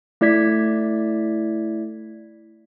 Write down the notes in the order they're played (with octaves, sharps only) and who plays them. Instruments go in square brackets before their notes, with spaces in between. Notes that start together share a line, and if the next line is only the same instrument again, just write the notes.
[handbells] A3 E4 D5 G#6 B6